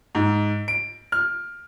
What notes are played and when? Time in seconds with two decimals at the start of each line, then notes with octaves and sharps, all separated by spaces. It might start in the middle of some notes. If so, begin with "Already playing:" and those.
0.15 G#2
0.68 D7
1.12 F6